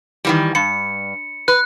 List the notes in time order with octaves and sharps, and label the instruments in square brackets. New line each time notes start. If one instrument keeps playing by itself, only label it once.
[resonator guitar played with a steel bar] D#3 E3 G3
[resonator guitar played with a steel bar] G2 [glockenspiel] C#7
[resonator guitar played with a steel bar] B4 [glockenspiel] F#6